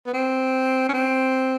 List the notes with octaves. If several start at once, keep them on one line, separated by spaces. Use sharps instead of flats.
B3
C4
C#4
C4